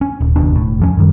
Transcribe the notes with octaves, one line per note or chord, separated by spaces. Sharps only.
C#4
D#1
F#1 D#2 B2 D4
E1 A2
F2 F3 C#4
F#2 D#3 G3